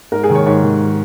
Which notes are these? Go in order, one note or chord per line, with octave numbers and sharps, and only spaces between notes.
G#2 A#4
G#4
D#3
C#5
G#2 C#5
D#3